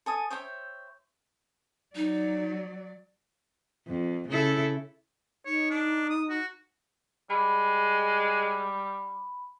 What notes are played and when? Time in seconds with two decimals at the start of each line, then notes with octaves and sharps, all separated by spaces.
0.06 A4 G#5 D#6
0.30 C5 C#5 E5 G5
1.96 F#3 D#4 D5
3.87 F2
4.29 C#3 E4 A4
5.46 D#4 C#5
5.70 D4
6.09 D#6
6.30 F#4
7.30 G3 G#3 B5